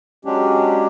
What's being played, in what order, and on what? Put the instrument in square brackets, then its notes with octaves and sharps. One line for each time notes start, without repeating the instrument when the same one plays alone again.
[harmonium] F#3 G#3 C#4 D4 G4